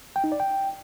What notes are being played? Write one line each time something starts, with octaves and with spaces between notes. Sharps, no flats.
G5
D#4
D5
G5